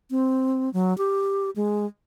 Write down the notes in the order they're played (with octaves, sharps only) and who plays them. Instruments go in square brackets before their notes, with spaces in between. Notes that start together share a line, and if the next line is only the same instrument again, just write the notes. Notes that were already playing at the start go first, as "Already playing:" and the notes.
[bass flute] C4
F#3
G4
G#3